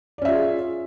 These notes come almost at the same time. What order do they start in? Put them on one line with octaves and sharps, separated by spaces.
D5 C#4 E5 F4 G#4